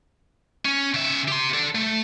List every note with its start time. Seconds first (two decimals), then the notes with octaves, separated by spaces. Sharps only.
0.65 C#4
0.94 C#3 E5
1.28 G4 C6
1.54 A4 D5
1.75 A3